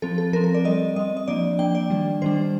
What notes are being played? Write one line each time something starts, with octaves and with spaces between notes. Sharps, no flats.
F3 C4 A4
A4
F3 C4 A#4
A#4
D5
G3 C4 D#5
G3 C4 D#5
D#5
F3 A#3 D4 D5
F3 A#3 D4 G5
D5
D#3 G3 D4
D#3 G3 D4 C5